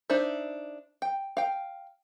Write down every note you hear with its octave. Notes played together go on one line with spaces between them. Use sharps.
D4 D#4 C5 E5
G5
F5 G5